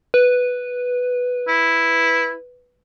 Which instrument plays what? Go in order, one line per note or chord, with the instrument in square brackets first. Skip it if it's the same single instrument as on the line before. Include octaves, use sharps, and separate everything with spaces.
[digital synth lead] B4
[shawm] E4